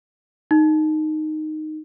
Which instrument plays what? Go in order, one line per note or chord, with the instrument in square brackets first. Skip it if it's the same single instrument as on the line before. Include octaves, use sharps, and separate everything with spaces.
[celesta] D#4